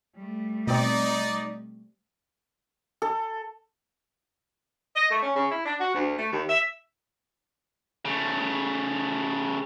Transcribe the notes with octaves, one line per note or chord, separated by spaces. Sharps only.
G3 A3
B2 C4 D#4 D5
A4
D#5
A3
C#4
C#3
E4
D4
F#4
D2
A3
D#2
E5
C#3 A3